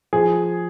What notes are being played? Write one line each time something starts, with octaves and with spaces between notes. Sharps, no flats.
F3 G#4